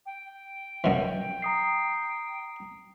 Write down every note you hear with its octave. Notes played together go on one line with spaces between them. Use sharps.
G5
F#2 B2 E3
A#5 D#6 C7